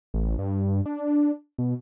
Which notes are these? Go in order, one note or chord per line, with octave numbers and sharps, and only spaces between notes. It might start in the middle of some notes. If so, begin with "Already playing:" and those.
A1
G2
D4
B2